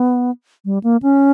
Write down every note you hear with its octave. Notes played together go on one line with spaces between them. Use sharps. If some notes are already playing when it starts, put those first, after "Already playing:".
Already playing: B3
G3
A#3
C#4